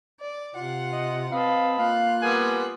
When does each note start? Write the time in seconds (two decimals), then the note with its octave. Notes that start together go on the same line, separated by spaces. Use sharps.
0.20 D5
0.55 C3 F4 F#5
0.92 D#5
1.32 C4 B4 D#5 F5 A5 B5
1.79 A#3 F4 F5 F#6
2.22 G3 B3 A#4 G#5